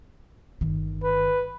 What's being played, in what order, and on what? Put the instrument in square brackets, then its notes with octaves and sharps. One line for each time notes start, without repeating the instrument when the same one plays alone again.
[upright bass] G1 D#3
[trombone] B4